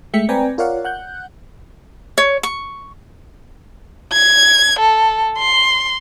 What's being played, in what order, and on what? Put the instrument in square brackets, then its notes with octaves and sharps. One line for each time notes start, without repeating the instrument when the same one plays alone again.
[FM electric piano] G#3 A3 E5 G5 B6 C#7
C4 B4 D5 G5 G#5 A#5
F4 A#4 C#5 D5 F5 F#5
F#5 F#6 G6
[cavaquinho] C#5
C#6
[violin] G#6
A4
C6